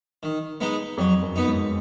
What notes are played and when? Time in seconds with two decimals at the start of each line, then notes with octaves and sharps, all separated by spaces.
0.23 D#3
0.61 G#3 B3 D#4
0.97 F2 F#3
1.22 F#2
1.36 B3 D#4
1.48 G#2